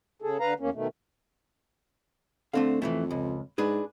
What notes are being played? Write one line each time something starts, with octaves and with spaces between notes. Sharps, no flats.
C#3 G#4 A4
D3 B4 F5 A#5
E2 A#3 C#4
B2 D#3 A3
D3 A3 C4 F5
F2 E3 F#3 A3
C#2
G#2 D4 G#4 B4